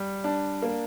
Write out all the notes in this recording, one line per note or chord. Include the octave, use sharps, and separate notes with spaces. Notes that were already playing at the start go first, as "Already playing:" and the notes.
Already playing: G3
D4
A#3